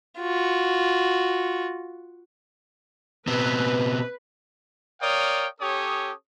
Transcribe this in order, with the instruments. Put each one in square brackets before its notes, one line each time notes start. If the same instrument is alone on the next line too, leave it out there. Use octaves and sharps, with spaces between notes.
[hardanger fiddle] F4 F#4
[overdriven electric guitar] B2 C4 [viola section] B4
[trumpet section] A#4 C#5 D5 F5 G5 D#6
C#4 G4 A4 C#5 D#6